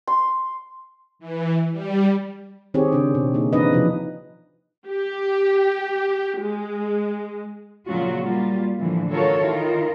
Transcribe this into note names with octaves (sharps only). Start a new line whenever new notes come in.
C6
E3
G3
D#3 C4 G4 G#4 C#5
C#3 D4
B2
A#3 D#4
E3 C4 D4 D#4 B4 D#5
C3 F3
G4
G#3
A#2 C#3 F#3 C#4 F4 F#4
G3 A#3 F4
A2 D3 E3 F3
F#3 F4 F#4 A4 A#4 C#5
D#3 E4 F4 A#4